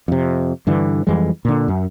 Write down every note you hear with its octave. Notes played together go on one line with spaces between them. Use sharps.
F2 C3
G2 D3 E3
F2 E3 G3 G#3
A#2 D3
F#2